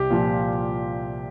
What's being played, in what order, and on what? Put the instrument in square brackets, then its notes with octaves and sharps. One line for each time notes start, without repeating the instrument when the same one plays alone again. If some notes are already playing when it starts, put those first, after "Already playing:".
Already playing: [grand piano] C2 G4
A#2 F3